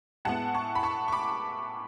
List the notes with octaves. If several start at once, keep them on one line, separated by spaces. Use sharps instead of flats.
A2 G#3 B3 F#5 A5
A5 C#6
B5
A5 C#6
C#6
B5 D6